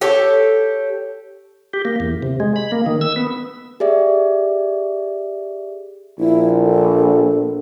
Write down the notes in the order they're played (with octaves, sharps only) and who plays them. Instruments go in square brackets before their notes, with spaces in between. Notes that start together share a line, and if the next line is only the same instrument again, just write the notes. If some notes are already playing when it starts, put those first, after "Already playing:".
[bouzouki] G4 A4 C#5
[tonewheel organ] G4
A#3
E2
C3
G#3
B5
A#3
D#3
E6
B3
[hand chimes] G4 G#4 D5 E5
[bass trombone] A#1 [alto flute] E4
[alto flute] A4